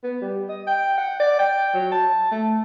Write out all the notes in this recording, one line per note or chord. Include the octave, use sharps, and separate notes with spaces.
B3
G3
D#5
G5
F#5
D5
G5
F#3
A5
A3